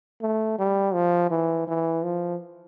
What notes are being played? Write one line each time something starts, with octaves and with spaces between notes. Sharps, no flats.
A3
G3
F3
E3
E3
F3